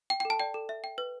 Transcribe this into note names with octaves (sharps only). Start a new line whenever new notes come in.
G5
G5
A4
A5
D5 G5
A4
E5
G5
B4